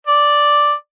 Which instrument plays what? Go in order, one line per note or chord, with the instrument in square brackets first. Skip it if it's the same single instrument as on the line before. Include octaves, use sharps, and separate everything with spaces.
[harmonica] D5